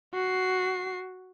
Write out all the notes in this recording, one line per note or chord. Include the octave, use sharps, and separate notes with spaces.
F#4 C7